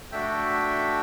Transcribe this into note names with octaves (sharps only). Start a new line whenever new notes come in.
A3 D4 F#4 E5 G5